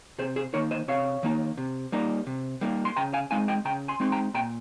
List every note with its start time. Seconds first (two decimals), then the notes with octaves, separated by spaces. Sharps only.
0.18 C3 G#4 C5
0.36 G#4 C5
0.54 D#3 A#3 D#4 A#4 C#5
0.71 C5 D#5
0.88 C3 C#5 F5
1.23 D#3 A#3 D#4
1.57 C3
1.92 G3 A#3 D#4
2.27 C3
2.61 G3 A#3 D#4
2.85 C6
2.97 C#3 G5 A#5
3.14 F5 G#5
3.31 G#3 C4 D#4 F5 G#5
3.48 D#5 G5
3.65 C#3 G5 A#5
3.88 G#5 C6
4.00 G#3 C4 D#4 C6
4.12 G5 A#5
4.34 A#2 G5 A#5